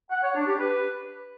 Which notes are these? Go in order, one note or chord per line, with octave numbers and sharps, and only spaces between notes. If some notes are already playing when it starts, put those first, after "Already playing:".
F#5
C#5
D4
G4
B4